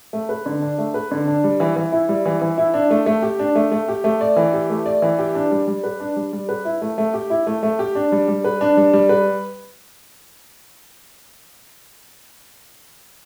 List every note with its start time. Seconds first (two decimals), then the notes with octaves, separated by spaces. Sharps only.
0.13 A3
0.29 B4
0.46 D3
0.62 D4
0.78 A3
0.94 B4
1.11 D3
1.27 D4
1.44 G3
1.60 E3
1.76 E3
1.92 E4
2.09 G3
2.26 E3
2.42 E3
2.58 E4
2.74 D4
2.90 A3
3.06 A3
3.22 G4
3.39 D4
3.55 A3
3.72 A3
3.89 G4
4.04 A3
4.21 D5
4.36 E3
4.53 G4
4.70 A3
4.86 D5
5.02 E3
5.19 G4
5.35 D4
5.51 G3
5.67 G3
5.84 B4
6.00 D4
6.16 G3
6.33 G3
6.49 B4
6.65 E4
6.82 A3
6.98 A3
7.14 G4
7.30 E4
7.47 A3
7.63 A3
7.79 G4
7.95 D4
8.12 G3
8.28 G3
8.44 B4
8.61 D4
8.77 G3
8.93 G3
9.09 B4